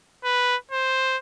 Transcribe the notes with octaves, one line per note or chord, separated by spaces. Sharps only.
B4
C5